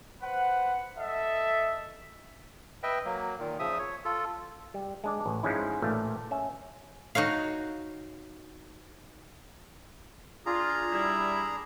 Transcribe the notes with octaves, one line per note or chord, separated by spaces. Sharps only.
B4 C5 F#5
A4 D#5 E5
B4 D#5 E5 G5
F#3 A#3
A#2 D#3
C#3 F3 E5 D#6
C#5
F4 A4
G3
G#3 D4 D5
A1
G#2 F3 G#3 C#4 D#4 E4
A1 A#2 A3 D5 F5
C#4 E5
D#4 F#4 C#5 F5
D4 F4 G#4 A#5
G3 E4